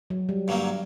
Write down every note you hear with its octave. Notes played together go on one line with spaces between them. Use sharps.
F#3
G3
G2 D3 F#3 A#3